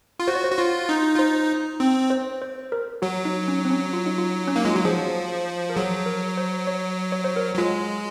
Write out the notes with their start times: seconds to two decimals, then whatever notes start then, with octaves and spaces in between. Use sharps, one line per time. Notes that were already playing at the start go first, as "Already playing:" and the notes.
0.20 F4
0.28 F#4 C5
0.35 C#5
0.44 C5
0.51 F#4
0.58 F4
0.89 D#4
1.15 F4
1.19 D#4 C5
1.80 C4
2.10 C5
2.42 C5
2.72 A#4
3.02 F#3 F#4
3.25 D#4
3.48 C#4
3.65 C4
3.70 C#4
3.93 F4
4.06 D#4
4.18 F4
4.48 C#4
4.56 A#3 D#4
4.65 G#3 F4
4.75 F#3 F#4
4.85 F3 G#4
5.70 A#4
5.76 F#3 G#4
6.06 A#4
6.37 C5
6.67 C#5
7.12 C#5
7.24 C5
7.36 A#4
7.55 F#3
7.58 G#3 F4